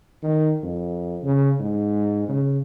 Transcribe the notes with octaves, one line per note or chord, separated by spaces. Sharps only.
D#3
F2
C#3
G#2
C#3